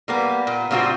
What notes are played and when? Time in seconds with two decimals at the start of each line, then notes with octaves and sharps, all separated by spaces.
0.08 G3 A#3 B3
0.47 A#2
0.71 A#2 G3 C4 F4 F#4 C5